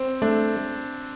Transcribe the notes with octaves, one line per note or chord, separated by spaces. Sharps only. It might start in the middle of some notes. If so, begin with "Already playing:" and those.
Already playing: C4
A3 D4